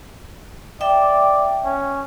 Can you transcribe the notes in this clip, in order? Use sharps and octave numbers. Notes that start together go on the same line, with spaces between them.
D5 E5 G5
C#4